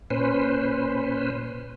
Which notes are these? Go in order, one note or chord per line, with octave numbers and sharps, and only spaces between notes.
A#2 C#4 B4 C5